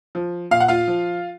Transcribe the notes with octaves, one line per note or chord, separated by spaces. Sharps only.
F3
A#2 F5
F#5
F4 F5
F3